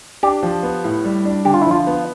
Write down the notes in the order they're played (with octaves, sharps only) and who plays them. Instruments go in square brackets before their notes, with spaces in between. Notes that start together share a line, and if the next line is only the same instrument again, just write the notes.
[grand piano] D4 [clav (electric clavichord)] G4
[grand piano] F3
B3
A2
G3
D4
[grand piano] D3 [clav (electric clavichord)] G4
[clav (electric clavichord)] F4
E4
[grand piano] F3 [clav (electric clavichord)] F4
[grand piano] B3